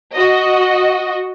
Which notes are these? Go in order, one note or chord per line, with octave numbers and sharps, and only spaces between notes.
F#4 D#5